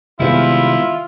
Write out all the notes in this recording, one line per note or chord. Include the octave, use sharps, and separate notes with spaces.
C3 D#3 G3 G#3 B3 C4 E4 F4